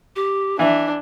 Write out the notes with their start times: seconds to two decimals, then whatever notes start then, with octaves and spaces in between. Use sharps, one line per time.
0.16 G4
0.59 E3 D4 E5